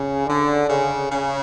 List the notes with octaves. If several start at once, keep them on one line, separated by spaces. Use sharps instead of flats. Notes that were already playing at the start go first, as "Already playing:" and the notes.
Already playing: C#3
D3
C#3
C#3